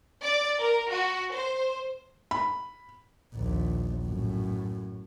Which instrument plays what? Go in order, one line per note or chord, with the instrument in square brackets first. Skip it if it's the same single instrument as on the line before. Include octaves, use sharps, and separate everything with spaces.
[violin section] D5
A#4
F#4
C5
[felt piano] B5
[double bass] A#1 D#2
F#2 A2